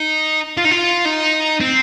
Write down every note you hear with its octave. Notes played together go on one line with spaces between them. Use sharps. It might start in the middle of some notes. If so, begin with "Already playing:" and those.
Already playing: D#4
F4
D#4
F4
D#4
C4